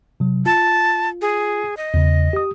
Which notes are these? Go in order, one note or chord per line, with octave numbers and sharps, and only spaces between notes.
C3 F#3
F4 A5
G#4
D#5
E2 C#3
G4 D#6